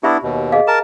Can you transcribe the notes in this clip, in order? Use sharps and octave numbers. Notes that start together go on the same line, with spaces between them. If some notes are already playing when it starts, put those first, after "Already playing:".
B3 D4 E4 G4 E5 B5
D#2 B2
G#4 D#5 F5
A#4 A5 A#5